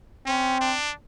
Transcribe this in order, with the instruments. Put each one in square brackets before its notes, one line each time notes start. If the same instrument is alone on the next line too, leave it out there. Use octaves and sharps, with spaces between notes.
[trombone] C4 [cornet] C#4
[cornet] D4